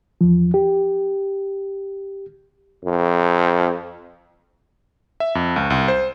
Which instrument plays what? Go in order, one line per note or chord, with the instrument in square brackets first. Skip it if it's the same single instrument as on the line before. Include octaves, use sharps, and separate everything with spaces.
[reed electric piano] E2 F3
G4
[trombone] F2
[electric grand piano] E5
F2
C#2
C2
C5